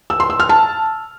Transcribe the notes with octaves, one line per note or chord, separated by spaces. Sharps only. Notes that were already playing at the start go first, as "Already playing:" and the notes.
E6
C6
E6
F6
A5